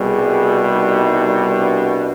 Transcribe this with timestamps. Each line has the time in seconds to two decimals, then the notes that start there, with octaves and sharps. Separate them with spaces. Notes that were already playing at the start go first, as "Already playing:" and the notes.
Already playing: C2 B2 G3 G#4
0.72 D#4
1.52 D4